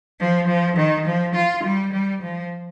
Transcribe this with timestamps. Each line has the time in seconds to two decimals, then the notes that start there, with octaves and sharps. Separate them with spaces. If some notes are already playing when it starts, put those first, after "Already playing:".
0.20 F3
0.48 F3
0.76 D#3
1.06 F3
1.34 F4
1.64 G3
1.93 G3
2.22 F3